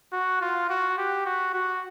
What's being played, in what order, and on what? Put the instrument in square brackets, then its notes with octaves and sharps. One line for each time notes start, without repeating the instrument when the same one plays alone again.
[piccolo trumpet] F#4
F4
F#4
G4
F#4
F#4